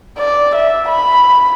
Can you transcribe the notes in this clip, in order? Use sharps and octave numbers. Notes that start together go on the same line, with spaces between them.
D5
E5
B5